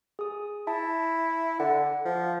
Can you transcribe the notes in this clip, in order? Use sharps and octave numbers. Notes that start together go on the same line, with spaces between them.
G#4 D#6
E4 A5
D3 F#5
F3